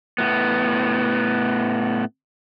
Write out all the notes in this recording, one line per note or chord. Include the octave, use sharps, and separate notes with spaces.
A2 B3